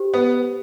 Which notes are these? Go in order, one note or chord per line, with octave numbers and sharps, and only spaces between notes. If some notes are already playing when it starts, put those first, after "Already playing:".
Already playing: G4 C5
B3